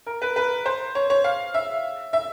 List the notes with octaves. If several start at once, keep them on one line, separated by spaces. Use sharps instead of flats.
A#4
B4
B4
C5
C#5
C#5
F5
E5
E5